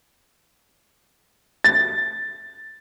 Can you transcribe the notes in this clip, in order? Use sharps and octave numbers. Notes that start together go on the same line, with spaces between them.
A6